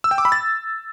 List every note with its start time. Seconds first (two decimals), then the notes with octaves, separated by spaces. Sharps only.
0.04 E6
0.11 G5
0.18 D6
0.25 B5
0.32 A6